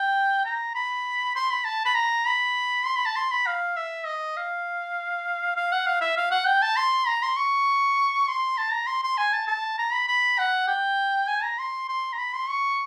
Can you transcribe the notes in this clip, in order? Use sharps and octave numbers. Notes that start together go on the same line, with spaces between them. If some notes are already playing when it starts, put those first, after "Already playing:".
Already playing: G5
A#5
B5
C6
B5
A5
B5
A#5
B5
C6
B5
A5
C6
B5
F5
E5
D#5
F5
F5
F#5
F5
E5
F5
F#5
G5
A5
C6
A#5
C6
C#6
C6
A5
A#5
C6
C6
G#5
A5
A5
A#5
B5
B5
F#5
G5
G#5
A#5
C6
C6
A#5
B5
C6
C#6